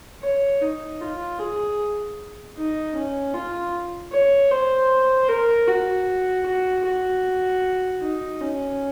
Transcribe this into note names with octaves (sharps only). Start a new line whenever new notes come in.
C#5
D#4
F4
G#4
D#4
C#4
F4
C#5
C5
A#4
F#4
F#4
F#4
D#4
C#4